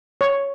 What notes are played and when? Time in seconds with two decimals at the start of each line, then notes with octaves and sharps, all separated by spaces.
0.21 C#5